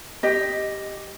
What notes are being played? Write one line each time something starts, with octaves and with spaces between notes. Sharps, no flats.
G4 D#5